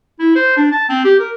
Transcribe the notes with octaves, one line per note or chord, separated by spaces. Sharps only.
E4
C5
D4
A5
C4
G4
A#4